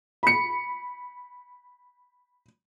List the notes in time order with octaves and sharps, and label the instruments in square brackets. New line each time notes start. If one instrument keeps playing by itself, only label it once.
[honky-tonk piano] B5 C#7